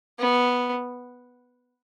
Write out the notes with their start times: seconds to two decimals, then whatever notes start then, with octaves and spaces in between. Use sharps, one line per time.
0.19 B3